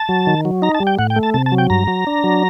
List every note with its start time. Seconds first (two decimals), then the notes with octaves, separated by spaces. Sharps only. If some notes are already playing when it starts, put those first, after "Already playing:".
Already playing: A5
0.09 F#3
0.27 D#3
0.45 F#3
0.62 D#4 A#5
0.75 A5
0.80 G3
0.87 G5
0.99 A2 F#5
1.10 G5
1.16 A3
1.23 A5
1.34 C3 A5
1.46 A5
1.52 F#3
1.58 G5
1.70 G2 A#5
1.88 F#3
2.07 D4
2.24 F#3